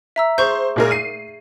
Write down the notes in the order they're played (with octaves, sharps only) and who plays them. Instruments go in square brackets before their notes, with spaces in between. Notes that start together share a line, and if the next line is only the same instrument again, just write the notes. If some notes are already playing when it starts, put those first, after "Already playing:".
[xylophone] E5 A#5 E6
[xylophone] G#4 C#6 G6 [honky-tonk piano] C5
[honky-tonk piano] A#2 G#3 A#4
C7 D#7